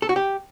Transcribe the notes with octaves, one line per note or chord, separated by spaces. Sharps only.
A4
F#4
G4